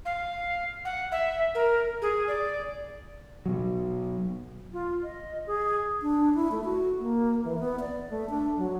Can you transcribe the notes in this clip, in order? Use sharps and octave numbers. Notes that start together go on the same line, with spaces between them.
F5
F#5
E5
A#4
G#4
D5
B2 F#3
F4
D#5
G#4
D4
E4
A3
F#4
A#3
E3
B3
D5
A3
D4
F#3